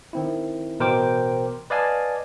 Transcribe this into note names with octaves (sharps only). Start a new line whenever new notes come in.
D#3 C4 E4
A1 B2 A#4 C5 G5 D6
B4 D5 D#5 F5 G#5 A5